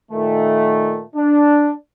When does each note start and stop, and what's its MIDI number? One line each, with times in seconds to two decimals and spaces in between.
0.12 1.01 46
0.12 1.01 51
0.12 1.01 57
1.16 1.72 62